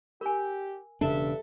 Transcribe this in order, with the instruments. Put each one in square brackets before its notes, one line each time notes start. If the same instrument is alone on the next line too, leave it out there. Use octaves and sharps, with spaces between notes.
[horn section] G4 [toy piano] A#4 G#5
[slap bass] E1 C#3 D4 [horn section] G2 E5 [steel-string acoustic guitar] A4